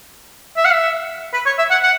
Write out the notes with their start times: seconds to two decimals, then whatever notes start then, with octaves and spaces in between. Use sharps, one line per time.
0.57 E5
0.65 F#5
0.72 E5
1.33 B4
1.46 C#5
1.58 E5
1.70 F#5
1.83 F#5